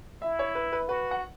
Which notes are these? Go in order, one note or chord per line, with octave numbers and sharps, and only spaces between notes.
E4 E5
C#5
B4
B4
F#4 B4
F#5